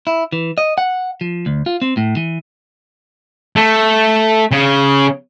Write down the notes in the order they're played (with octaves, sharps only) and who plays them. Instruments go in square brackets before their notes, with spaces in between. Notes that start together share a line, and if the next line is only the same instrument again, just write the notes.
[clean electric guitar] E4
E3
D#5
F#5
F3
D2
F4
C4
A2
E3
[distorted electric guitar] A3
C#3